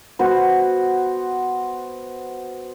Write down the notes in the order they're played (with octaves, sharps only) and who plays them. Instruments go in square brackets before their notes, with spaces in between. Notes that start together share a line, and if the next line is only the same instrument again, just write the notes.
[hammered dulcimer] B3 F#4 C5